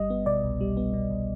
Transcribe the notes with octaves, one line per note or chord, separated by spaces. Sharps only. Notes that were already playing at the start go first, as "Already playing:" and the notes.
Already playing: G1 G3 D#5
B3
B2 D5
C2
G3
B3
B2
C2